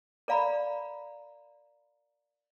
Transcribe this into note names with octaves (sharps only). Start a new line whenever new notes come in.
A#4 D5 F5 A#5 B5